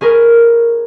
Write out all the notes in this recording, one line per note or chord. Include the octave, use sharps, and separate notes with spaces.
C#4 G#4 A#4 B4